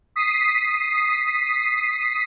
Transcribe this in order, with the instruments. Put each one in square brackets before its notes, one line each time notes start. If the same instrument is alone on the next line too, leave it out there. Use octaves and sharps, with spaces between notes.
[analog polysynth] D#6 B6 C7